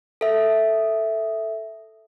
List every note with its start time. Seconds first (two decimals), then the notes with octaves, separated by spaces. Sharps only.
0.21 A4 E5